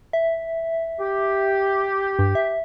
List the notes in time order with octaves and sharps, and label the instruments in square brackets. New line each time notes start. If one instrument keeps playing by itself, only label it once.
[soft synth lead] E5
[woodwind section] G4
[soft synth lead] G2
E5